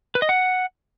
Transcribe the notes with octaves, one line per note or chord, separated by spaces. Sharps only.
B4
D#5
F#5